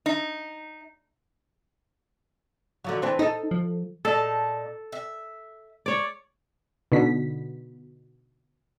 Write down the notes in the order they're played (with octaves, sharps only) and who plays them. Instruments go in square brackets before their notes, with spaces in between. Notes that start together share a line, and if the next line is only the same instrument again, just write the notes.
[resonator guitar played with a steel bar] D#4
[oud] D3 F3 F#3
E3 C4 D4
[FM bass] D#4 [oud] A4 D#5
[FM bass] F3
[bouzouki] A#2 D#4 A5 [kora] A4
[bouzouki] E5
[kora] C#5 D5
[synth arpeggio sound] B2 D3 D#4 B6